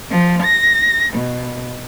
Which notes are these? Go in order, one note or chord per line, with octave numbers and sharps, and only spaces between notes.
F3
A#6
B2